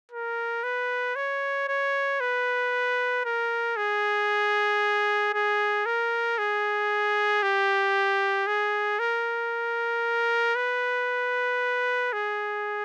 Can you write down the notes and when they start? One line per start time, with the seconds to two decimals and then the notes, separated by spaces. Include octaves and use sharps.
0.12 A#4
0.63 B4
1.16 C#5
1.68 C#5
2.20 B4
3.25 A#4
3.77 G#4
5.34 G#4
5.86 A#4
6.38 G#4
7.43 G4
8.47 G#4
8.99 A#4
10.56 B4
12.13 G#4